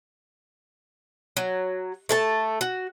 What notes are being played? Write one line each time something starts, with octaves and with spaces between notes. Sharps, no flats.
F#3
A3 A4 A5
F#4